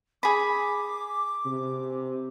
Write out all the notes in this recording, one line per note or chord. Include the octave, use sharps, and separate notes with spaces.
G#4 B5 D6
C3